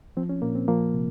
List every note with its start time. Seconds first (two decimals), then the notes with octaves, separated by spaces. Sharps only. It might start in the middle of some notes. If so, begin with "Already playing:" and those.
0.17 F3 C4
0.29 C#4
0.42 A#2 A#3
0.55 C4
0.68 F3 A#3
0.94 C3